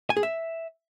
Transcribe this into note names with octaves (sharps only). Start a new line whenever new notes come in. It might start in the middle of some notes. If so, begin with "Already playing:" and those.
G#5
G#4
E5